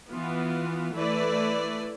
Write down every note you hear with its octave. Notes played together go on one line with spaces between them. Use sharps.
E3 B3 F4
E3 A3 E4 B4 D5